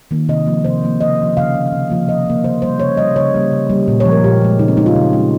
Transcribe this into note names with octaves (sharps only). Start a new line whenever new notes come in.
D#3 A#3
C3 D#5
F3 A#3
C3 C5
F3 A#3
C#3 D#5
F3 A#3
C#3 F5
F3 A#3
C3
F3 A#3
C3 D#5
F3 A#3
C#3 C5
G3 A#3 C5
C#3 C#5
G3 A#3 D#5
C#3 C#5
G3 A#3
C#3
G3 A#3
A#2
C#5
F3 G#3
A#4
A#2 G4
F3 G#3
C#3 D#4
C4
G#3 D#4
F4
C#3
G#3